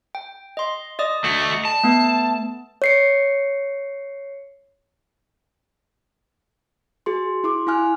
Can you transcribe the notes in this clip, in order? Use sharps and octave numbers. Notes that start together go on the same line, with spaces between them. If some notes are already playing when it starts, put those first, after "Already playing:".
G5
D#5 C6
D5 D#5 D#6
A3 F#4
A5
A3 B3
C#5 C7 C#7
F#4 G#4 C6
E4 C6 D6
E4 F5 G#5 F6 F#6